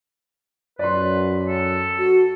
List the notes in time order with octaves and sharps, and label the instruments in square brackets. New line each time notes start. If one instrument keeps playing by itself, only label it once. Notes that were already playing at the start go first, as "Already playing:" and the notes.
[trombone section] F#2 [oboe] B4 [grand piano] D5 C6
[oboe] A4
[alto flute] F#4